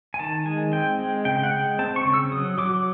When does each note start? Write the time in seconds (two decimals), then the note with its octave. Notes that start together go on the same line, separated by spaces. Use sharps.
0.14 G#5
0.19 D#3 A5
0.45 G#3 G#5
0.72 C4 G5
0.99 G#3
1.25 C#3 G5
1.43 F#5
1.51 G#3 G5
1.79 C4 A5
1.96 C#6
2.05 C#3
2.14 E6
2.32 F#3 D#6
2.58 F#3 D6